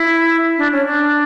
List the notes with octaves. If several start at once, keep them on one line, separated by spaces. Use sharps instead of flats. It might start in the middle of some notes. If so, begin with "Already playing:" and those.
Already playing: E4
D4
C#4
D4